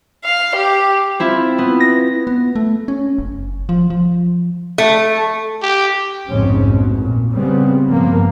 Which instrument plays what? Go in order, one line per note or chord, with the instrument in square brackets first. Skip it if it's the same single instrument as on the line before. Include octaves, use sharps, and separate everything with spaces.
[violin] F5
G4
[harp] C4 E4 F4
B3
A#6
[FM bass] B3
A3
C#4
F#1
F3
F3
[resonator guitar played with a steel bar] A3
[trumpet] G4
[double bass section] F1 A#1 G#2 C#3 C4 C#4
B2
A#2
C#3 G3 B3 C4
G2 F3 A#3 B3